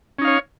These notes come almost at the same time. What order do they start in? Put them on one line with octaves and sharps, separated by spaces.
C#4 D#4 F5 C#5